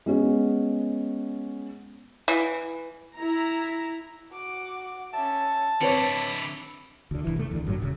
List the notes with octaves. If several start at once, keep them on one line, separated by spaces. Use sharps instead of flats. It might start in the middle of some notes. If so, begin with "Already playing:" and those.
G#3 B3 C#4
E3
E4 A#5
F#4 D6
C#4 E5 A5
D3 C4 E4 B4 C#5 B5 D6
D2 D3
E1 A#1 E3
C2 A3
E2 D3
A1 G2 A#2 F#3
D#1 F#2 C#3